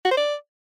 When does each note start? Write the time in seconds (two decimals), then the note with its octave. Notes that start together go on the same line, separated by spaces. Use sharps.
0.05 F#4
0.11 C5
0.17 D5